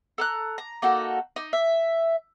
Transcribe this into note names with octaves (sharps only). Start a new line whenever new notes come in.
A4 A#5 F#6
A#5
A#3 D#4 F#4 A4
D#4
E5